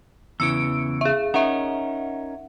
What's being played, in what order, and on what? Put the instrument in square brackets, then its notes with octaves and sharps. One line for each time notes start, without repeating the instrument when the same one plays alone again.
[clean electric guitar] E2 C#3 E3 [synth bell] E6 C#7 D7
[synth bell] G#4 E5
[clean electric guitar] C#4 D#4 A#4 [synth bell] E5 F#5